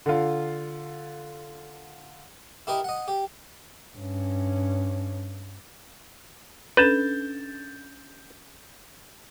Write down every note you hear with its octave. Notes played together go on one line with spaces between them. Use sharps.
D3 F4
E4 G4 A#4 D#5
D#5 F#5
G4
G2 C#4
C#4 D4 A4 B4 G6 A6 E7